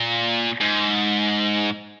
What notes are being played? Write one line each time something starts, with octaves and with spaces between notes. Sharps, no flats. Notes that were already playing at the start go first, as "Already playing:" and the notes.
Already playing: A#2
G#2